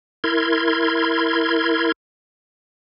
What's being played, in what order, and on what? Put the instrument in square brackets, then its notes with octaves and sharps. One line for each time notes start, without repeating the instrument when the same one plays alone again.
[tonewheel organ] E4 A#4 C6 G#6